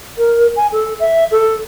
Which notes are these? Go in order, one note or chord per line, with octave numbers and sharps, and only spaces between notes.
A#4
G#5
A4
E5
A4